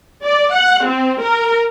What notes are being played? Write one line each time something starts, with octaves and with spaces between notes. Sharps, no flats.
D5
F#5
C4
A#4